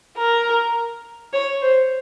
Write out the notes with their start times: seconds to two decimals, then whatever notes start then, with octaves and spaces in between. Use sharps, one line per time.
0.18 A#4
1.33 C#5
1.62 C5